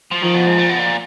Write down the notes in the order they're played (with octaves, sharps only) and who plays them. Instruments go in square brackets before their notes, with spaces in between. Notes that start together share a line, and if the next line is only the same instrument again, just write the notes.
[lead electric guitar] F3
[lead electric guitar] D#3 [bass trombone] F3
[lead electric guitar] B2
G#2
A#2
B2
A#2